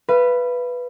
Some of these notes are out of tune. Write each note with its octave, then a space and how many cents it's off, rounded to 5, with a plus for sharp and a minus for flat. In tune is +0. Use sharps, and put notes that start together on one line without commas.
B4 +0 F5 -40